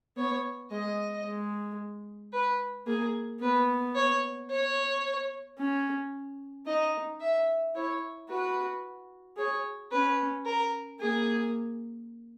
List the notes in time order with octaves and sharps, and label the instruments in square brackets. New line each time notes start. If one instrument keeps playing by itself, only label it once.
[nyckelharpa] B3 [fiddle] C#5
[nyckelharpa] G#3 [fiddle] D#5
[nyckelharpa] G#3
[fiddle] B4
[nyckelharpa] A#3 [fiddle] G#4
[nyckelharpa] B3 [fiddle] B4
[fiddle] C#5
C#5
[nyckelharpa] C#4
[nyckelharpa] D#4 [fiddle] D#5
[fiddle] E5
[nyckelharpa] E4 [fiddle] C#5
[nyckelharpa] F#4 [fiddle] B4
[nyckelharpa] G#4 [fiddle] C#5
[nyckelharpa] C#4 [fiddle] B4
[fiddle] A#4
[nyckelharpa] A#3 [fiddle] G#4